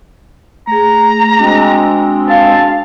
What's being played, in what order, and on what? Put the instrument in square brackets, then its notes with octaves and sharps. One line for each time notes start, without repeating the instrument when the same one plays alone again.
[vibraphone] A3 G#4 [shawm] A#5
[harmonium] G#3 C4 [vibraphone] D4 F#4
[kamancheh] F5 [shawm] A5